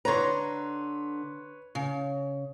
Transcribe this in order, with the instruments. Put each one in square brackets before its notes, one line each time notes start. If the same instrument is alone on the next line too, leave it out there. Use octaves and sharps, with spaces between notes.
[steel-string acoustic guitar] D3 A#5 [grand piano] B4 C#5 C6
[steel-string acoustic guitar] C#3